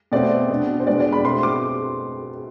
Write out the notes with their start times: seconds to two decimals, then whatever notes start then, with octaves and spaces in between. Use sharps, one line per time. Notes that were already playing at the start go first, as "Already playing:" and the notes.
0.12 B2 A3 C4 D5
0.50 B2 B3 D4
0.80 C5
0.87 B2 G#3 D4 D5
1.00 D5
1.12 B5
1.24 B2 A3 C4 C6
1.43 D6